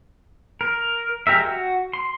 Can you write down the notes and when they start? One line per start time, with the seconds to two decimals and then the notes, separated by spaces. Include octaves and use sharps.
0.61 A#4
1.27 G#3 G4 A#4 E5
1.44 F#4
1.93 C6